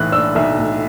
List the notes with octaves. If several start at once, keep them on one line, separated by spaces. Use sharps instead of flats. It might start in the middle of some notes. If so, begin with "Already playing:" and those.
Already playing: B1 A2 E3 F#6
D4 E6
B1 E5
A2